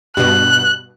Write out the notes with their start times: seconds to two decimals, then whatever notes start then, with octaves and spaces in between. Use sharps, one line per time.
0.17 G2 B2 F#6